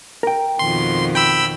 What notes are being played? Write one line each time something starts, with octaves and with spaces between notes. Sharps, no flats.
A#4 G5
F2 B2 D#3 C6
G5 B5 E6